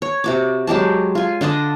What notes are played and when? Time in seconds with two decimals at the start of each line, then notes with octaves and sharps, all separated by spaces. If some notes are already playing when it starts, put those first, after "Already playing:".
0.02 C#5
0.24 C3 F#4 D6
0.67 F#3 G#3 G4 A5
1.15 F4 G#5
1.41 D3 D4 A4 D#5